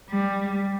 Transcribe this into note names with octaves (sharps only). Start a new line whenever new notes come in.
G3